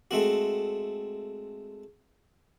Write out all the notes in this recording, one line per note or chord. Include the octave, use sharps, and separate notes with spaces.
G#3 A3 C4 F#4